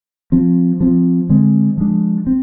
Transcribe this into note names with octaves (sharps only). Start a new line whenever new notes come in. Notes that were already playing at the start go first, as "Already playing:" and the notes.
F3 C4
F3 C4
D3 G#3 C4
F3 G#3 D4
C4